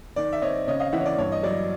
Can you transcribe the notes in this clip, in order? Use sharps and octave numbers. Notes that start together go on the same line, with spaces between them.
D#3 D5
E5
C4 C#5 D#5
C#3 C#5 D#5
D#5 F5
E3 E5 F#5
C#5
D5
G2 C#5
D#5
F#3 D5